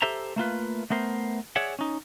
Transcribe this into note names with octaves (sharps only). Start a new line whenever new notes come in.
G4 A4 C5 E5 A#5
A3 A#3 F4 B4
A3 B3 A#4 C5
G#4 C#5 D5 E5 F#5
C#4 D#4